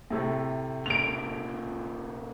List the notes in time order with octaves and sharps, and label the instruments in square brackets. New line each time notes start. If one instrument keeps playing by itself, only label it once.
[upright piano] A2 C3 A3
[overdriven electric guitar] A#2 C#3 [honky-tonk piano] D7 F7